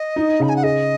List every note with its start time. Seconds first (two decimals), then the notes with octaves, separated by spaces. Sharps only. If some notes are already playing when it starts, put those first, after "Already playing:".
Already playing: D#5
0.16 D#4
0.40 C#3 B5
0.49 G#5
0.56 F#5
0.63 G#4 D#5